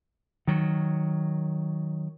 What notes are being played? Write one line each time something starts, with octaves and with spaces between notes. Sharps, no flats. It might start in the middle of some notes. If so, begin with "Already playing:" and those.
D#3 F#3